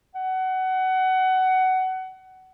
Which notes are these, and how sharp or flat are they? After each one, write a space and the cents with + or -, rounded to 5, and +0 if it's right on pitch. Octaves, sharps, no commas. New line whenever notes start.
F#5 +20